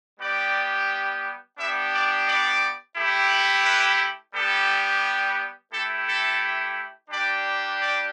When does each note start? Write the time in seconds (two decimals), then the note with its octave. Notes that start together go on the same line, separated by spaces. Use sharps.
0.19 G3 B3 G4 D5
1.57 B3 D4 G4 E5
1.92 D5
2.26 D5
2.96 A3 E4 G4
3.65 B4
4.34 G3 B3 G4 A4
5.72 A3 E4 G4 A4
6.07 A4
7.10 G3 D4 G4 D5
7.80 D5